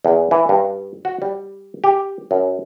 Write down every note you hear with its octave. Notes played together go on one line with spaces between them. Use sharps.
E2
E3
G2
F#4
G3
G4
F#2